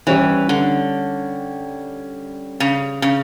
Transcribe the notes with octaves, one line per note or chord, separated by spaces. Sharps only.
E3 G3 C#4 G4 C#5
D3
C#3
C#3